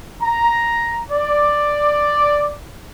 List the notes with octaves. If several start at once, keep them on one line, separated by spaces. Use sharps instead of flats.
A#5
D5